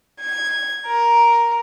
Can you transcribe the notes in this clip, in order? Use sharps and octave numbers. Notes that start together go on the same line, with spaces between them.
G#6
A#4